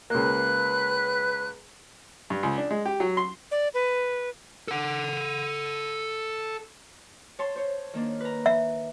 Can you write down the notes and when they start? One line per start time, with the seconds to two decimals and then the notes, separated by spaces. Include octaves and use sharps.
0.10 C#2 A#3 B4 F#6
2.30 G2
2.43 C#2
2.58 D4
2.71 G#3
2.86 G4
3.00 F#3
3.17 C6
3.51 D5
3.74 B4
4.68 A4 F#5
7.39 C#5 A5 C6
7.56 C5 C#5
7.93 D#3 A#3 D4
8.20 B4 A#5
8.46 E5